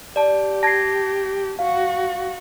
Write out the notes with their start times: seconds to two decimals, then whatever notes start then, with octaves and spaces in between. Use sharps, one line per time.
0.16 G4 D5 A5
0.63 A5 G#6 A#6 C7
1.59 F#4 F5